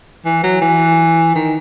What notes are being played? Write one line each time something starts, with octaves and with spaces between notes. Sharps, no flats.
E3
F#3
E3
D#3